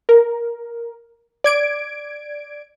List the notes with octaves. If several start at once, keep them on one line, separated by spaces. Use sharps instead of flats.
A#4
D5 G#6 D7